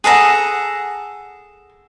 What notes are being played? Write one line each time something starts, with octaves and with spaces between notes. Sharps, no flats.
G#4 A4 F#5 A#5